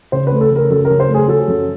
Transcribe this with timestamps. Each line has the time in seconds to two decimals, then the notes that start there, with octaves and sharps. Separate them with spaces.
0.12 C#3 C5
0.27 B4
0.32 A3
0.41 A4
0.51 C#3 A#4
0.70 F#2 A4
0.85 A#4
0.90 C#3
1.00 C5
1.09 A3
1.14 G#4
1.28 F#3 A4
1.48 F#2